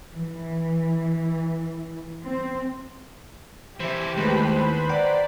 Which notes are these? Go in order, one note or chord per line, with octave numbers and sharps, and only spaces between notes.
E3
C4
C3 E3 G4 C5 E5
D#2 G#3 A3 E4 B4 C5 B5
D5 F#5 G5 A#5